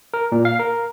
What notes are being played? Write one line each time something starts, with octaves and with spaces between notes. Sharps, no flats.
A#4
A#2
F5
A#4